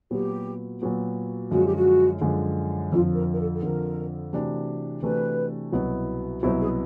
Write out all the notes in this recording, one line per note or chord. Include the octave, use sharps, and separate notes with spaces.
A#2 F#3 B3 G4
A#2 F#3 B3
F#2 D3 F3 G#3 F#4
G4
F#4
F#2 D3 F3 G#3
F2 D3 F3 F4
A#4
A#4
A4
A4
F2 D3 F3 A#4
C3 E3 A3 D4 F#4
C3 E3 A3 D4 F#4 B4
C2 B2 F#3 B3 E4
C2 B2 F#3 B3 E4 C5
G#4